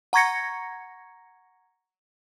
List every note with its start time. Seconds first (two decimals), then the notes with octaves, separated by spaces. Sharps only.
0.13 F#5 A#5 C#6 G#6 A#6 C#7